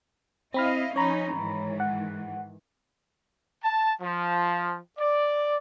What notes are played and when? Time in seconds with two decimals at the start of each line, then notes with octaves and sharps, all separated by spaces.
0.54 C4 E4 D#5 F5 B5 F6
0.96 F3 C#4 D#4 C#5 A#5 B5
1.33 G#2 D#3 E3
1.80 F#5
3.64 A5
4.02 F3
4.99 D5